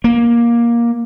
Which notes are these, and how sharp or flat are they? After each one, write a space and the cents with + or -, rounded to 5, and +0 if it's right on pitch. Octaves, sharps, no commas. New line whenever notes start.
A#3 +15